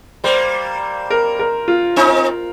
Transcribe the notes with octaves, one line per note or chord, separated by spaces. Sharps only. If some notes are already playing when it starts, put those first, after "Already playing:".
G3 A#3 C5
A#4
A#4
F4
C4 D#4